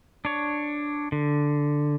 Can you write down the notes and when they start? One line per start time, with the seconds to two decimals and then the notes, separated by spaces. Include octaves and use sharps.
0.25 D4 C#5
1.12 D3